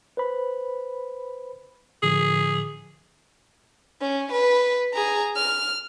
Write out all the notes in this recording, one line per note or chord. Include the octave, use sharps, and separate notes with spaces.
B4 C5 B5
A2 D3 F3 G#4
C#4
B4
G#4 A#5
F6